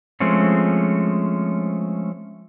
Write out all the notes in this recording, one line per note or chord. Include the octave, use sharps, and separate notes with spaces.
F3 G#3 A3 C4 C#4